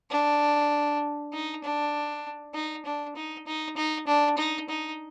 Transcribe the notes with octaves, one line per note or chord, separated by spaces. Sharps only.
D4
D#4
D4
D#4
D4
D#4
D#4
D#4
D4
D#4
D#4